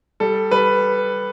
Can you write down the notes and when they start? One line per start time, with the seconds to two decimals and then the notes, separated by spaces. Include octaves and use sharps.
0.20 G3 A4
0.51 G3 B4